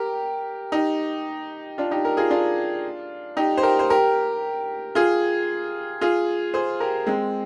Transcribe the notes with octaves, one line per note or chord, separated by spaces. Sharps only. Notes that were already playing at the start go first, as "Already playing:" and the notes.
Already playing: G4 A#4
D#4 G4
D4 F4
D#4 G4
G4 A#4
F4 G#4
D4 F4
D#4 G4
C5
G4 A#4
C5
G4 A#4
F4 G#4
F4 G#4
G#4 C5
G4 A#4
G#3 C4